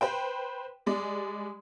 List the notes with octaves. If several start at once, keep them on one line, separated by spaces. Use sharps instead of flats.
B4 C5 G5
G3 G#3 D5